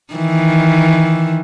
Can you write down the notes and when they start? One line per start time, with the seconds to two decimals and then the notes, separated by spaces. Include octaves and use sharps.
0.14 D#3 E3